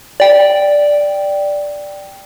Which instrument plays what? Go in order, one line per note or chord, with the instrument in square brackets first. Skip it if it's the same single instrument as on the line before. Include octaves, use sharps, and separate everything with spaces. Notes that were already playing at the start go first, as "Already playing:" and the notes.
[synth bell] D5 G5